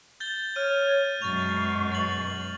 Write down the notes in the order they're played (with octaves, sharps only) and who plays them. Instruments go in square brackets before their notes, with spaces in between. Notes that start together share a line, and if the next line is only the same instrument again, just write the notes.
[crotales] G6 A6 G7
[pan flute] C#5 [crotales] F6 D#7
[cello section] F#2 B2 G#3 [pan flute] C#6 [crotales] A6 F7
[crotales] A6 F#7